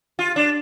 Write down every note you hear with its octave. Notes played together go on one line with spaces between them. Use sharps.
F4
D4